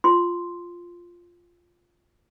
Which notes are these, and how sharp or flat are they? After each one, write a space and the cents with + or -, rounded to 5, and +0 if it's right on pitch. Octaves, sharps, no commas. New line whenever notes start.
F4 +0 C6 +0